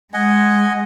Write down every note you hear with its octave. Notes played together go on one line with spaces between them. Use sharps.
G#3 D#5 F#5 G#5